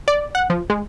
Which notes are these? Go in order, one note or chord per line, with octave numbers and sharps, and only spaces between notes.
D5
F#5
F3
G#3